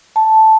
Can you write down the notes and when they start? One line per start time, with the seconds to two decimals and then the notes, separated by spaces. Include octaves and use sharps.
0.16 A5